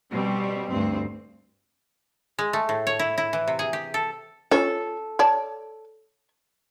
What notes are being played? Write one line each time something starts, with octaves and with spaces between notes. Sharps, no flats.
B2 G3 C4
D2 G2 C4
G#3
A3
A2
C#5
E4
E4
E3
C3
G#4
G4
A4
C#4 F4 A4 C#5
C#5 D5 A5